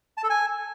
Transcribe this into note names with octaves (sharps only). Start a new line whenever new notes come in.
A5
A4
G#5